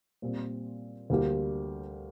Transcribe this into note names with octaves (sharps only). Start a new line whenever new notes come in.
A#2 G3 C4
D2 D3 G3 A#3 G4